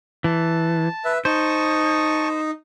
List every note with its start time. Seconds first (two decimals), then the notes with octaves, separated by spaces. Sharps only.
0.24 E3 A5
1.05 B4 E5
1.25 D#4 C5 A5 C#6 D#6